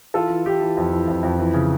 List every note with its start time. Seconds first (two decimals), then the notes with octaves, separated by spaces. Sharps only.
0.14 E3 F4 A4
0.29 E3
0.45 E3 G4
0.61 E3
0.77 F2
0.92 E3
1.08 F2
1.23 F2
1.39 E3
1.54 C#3